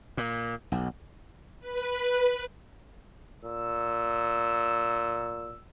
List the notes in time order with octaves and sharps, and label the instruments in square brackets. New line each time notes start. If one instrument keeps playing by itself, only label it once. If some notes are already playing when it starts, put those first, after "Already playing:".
[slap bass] A#2
B1
[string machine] B4
[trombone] A#2 [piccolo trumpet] E6